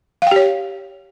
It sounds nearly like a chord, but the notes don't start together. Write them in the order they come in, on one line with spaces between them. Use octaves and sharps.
F5 G5 G4 C#5